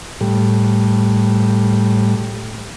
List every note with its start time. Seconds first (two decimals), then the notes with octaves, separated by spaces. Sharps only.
0.21 A2 G3